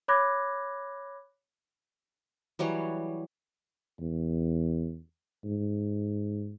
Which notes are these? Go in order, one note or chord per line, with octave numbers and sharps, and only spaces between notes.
C#5 B5 D6 F#6 G#6 A#6
E3 F#3 G3 C#5
E2
G#2